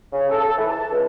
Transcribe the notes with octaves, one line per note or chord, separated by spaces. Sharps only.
C#3
A4
A4
E3
A5
C#2